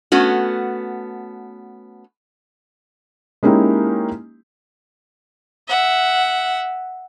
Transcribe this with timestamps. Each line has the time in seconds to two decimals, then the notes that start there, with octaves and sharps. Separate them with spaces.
0.12 A3 B3 C#4 F#4
3.43 G#3 A#3 C#4 D#4 E4 G4
5.68 E5 F#5